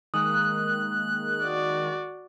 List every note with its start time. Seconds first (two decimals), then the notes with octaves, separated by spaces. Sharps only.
0.14 D#3 G#3 A#3 D#6 F#6
1.44 F#4 D5